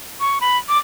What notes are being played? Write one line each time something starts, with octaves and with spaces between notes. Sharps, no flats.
C#6
B5
D6